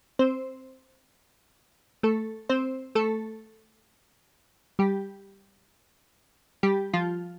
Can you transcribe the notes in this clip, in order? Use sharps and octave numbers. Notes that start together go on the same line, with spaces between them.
C4 C5
A3 A4
C4 C5
A3 A4
G3 G4
G3 G4
F3 F4